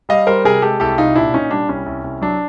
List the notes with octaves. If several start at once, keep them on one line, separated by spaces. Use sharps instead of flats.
G3 D#5 F5
G3 A#4 C5
C3 G#4 A#4
G#3 G4 A4
C2 G4 A4
C3 D#4 F4
A#2 D4 E4
A#2 C#4 D#4
G3 D4
C2 C#4
C2
C2
F#3 D4